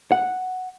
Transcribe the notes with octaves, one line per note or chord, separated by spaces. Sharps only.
F#5